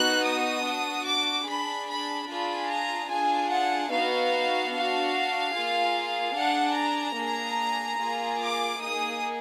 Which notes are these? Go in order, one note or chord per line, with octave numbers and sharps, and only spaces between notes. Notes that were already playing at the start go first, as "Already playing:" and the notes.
Already playing: B3 D#4 F#4 F#6
D#6
D4 F#4
D6
D4 G#4 B5
B5
D4 F4 G#4 B5
A#5
D4 F4 G#4 G#5
F#5
B3 D#4 F#4 F5
D4 F#4 F5
A#3 F4 G#4
D4 G#4 F#5
A#5
A#3 D4 G#4
A#3 F4 G#4
D6
A#3 D#4 G#4 D#6